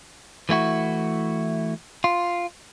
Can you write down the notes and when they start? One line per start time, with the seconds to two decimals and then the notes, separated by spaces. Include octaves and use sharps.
0.49 E3 A3 E4 F#4
2.04 F4